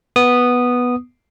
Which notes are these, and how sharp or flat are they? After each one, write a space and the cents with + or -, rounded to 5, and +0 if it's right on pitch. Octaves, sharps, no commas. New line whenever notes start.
B3 -5 D#6 -15